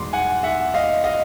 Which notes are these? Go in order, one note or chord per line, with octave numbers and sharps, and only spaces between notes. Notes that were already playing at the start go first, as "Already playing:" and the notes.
Already playing: E2 B2 G#3 C6 D6
F#5 G#5
E5 F#5
D#5 F5
D#5 F5